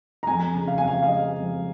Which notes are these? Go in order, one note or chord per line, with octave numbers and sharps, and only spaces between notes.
A#5
F2 G#5
C#3
F5
F2 G#5
F5
F5
G#3 D#5
F2